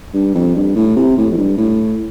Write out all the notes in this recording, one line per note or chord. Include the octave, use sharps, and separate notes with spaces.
G2
F2
G2
A2
C3
A2
F2
G2
A2